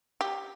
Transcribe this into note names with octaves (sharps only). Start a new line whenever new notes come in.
G4